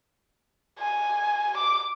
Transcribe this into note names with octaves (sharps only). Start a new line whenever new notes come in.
G#5
D6